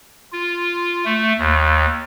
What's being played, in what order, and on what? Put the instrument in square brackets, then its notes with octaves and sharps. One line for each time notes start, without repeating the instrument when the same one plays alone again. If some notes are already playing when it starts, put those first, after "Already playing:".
[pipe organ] F4
A3
D#2